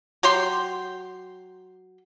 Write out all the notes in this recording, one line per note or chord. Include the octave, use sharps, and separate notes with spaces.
F#3 G4 G5 C6